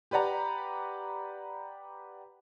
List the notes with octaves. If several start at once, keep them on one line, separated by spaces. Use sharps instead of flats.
G4 B4 D5 F#5 A#5